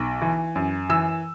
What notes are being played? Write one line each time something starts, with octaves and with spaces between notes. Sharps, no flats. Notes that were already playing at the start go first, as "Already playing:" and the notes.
Already playing: B1
E3
F#2
E3 E6